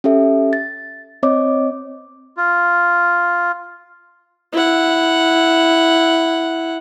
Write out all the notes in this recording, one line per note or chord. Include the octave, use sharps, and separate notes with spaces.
C#4 G4 A4 E5
A6
C4 C#5 D#5 D6
F4
E4 F#5